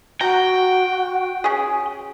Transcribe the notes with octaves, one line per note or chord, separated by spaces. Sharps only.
F#4 G5 A#5
C#4 G#4